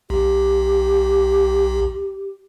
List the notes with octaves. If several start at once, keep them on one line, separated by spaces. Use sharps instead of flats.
B1 G4